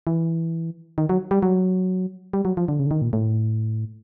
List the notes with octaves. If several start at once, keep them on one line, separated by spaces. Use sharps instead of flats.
E3
D#3
F#3
G3
F#3
G3
F#3
F3
D3
C#3
D3
D#3
A#2
A2